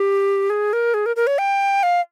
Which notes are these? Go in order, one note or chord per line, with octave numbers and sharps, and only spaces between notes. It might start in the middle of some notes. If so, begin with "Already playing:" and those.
Already playing: G4
G#4
A#4
G#4
A#4
A#4
C#5
G5
F5